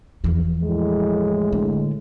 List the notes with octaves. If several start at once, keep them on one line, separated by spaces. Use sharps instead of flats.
E2 F3
A2 G#3
D3